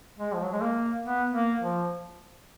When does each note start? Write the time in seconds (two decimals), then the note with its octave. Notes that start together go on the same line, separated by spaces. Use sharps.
0.18 G#3
0.34 F3
0.43 F#3
0.52 G#3
0.61 A#3
1.05 B3
1.33 A#3
1.62 F3